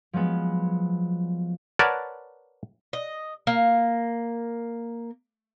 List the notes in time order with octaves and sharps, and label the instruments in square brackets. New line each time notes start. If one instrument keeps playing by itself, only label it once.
[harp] F3 F#3 G#3 B3
[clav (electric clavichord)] A#4 B4 C#5 D5 F#5 A5
[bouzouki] D#5
A#3